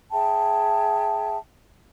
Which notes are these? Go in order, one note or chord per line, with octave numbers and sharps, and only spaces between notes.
G#4 E5 G5 A5